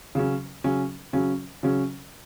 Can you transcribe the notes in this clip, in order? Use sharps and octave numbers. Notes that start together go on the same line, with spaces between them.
C#3 F#3 C#4
C#3 F#3 C#4
C#3 F#3 C#4
C#3 F#3 C#4